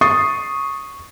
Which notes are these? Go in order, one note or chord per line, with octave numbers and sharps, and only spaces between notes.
C#6 D#6 A6 C7